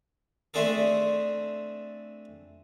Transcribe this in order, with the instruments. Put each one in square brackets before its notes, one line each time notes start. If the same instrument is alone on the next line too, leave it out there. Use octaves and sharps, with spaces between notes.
[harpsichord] A3 C4 D4 G#4 A4